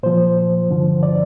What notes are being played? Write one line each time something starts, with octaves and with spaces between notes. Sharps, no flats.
A#2 F3 C5
G2 D3 F3
D5